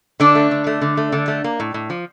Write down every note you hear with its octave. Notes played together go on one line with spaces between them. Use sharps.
D3 D4
A3
D3
A3
D3
A3
D3
A3
A#3
A2
A2
F3